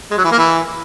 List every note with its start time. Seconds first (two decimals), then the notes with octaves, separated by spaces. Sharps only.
0.11 G#3
0.18 F#3
0.24 E3
0.31 A#3
0.38 E3